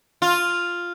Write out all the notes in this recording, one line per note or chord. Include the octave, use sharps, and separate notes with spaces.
F4